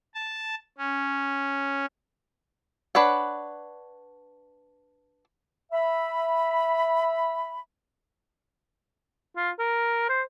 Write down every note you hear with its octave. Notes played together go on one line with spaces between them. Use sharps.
A5
C#4
D4 B4 C#5 F#5
E5 B5
F4
A#4
C5